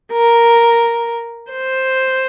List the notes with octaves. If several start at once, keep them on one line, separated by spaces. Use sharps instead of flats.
A#4
C5